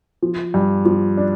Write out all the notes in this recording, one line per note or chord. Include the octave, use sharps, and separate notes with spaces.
F3
G2
F3
D4